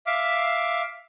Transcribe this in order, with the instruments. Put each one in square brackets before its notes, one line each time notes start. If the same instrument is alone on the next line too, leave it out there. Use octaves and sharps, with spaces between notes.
[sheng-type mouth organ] E5 F5 D6